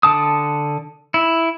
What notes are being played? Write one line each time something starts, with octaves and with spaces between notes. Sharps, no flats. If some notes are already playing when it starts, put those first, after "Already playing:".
D3 A5 D#6
E4